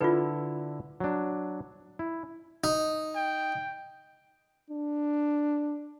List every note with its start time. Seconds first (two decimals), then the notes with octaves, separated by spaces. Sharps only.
0.01 D3 E4 F4 A4 B4
1.00 F#3 D4
1.99 E4
2.64 D#4
3.16 G5
4.70 D4